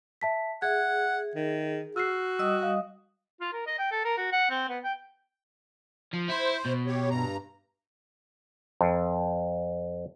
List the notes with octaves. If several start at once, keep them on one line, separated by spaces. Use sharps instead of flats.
E5 A5 B6
G#4 E5 F#5 G#6
D#3
F#4 E6 F6 C7
G3 D#5 D#6 E6
F5
F4
A#4
D#5
G5
A4
A#4
F#4
F#5
C4
B3
G5
F3
E4 C5
B2
G4 C#5
G2 A#5
F2